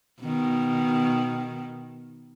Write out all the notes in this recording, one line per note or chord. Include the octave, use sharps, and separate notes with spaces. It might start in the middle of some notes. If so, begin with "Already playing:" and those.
B2 D#3